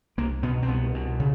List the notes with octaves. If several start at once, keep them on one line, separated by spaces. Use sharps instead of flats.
C2 A#3
B2 B3
C4
C2 B3
B2
C#3